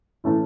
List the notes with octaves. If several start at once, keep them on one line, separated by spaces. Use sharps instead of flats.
A2 E3 A3 C#4 E4